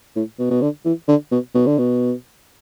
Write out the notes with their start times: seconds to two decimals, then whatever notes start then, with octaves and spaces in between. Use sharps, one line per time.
0.16 A2
0.39 B2
0.51 B2
0.62 D3
0.85 E3
1.08 D3
1.32 B2
1.55 B2
1.66 D3
1.78 B2